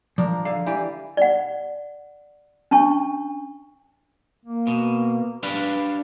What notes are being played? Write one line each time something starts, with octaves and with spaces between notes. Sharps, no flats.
F3 D4 A#4
D3 F5
E3 G4 D5
D5 F#5
C#4 D4 A5 C#6
A#3
B2
D4 G4 B4 F5